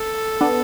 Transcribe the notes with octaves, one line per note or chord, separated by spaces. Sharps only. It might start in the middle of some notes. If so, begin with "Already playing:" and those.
Already playing: A4
B3 D4